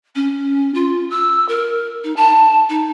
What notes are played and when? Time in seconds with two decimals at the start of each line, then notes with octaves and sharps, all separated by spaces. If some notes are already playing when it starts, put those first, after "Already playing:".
0.15 C#4
0.74 F4
1.10 E6
1.48 A#4
2.04 D#4
2.16 A5
2.69 D#4